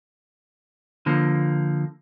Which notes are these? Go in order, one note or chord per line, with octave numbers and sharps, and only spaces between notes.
D3 F3 A#3